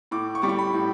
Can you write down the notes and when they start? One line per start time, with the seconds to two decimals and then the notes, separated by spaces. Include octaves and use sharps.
0.11 A2 D6
0.35 C#6
0.42 G3 D6
0.49 C#6
0.58 B5
0.74 A2